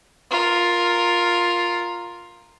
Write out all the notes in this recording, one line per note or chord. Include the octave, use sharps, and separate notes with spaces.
F4 A#4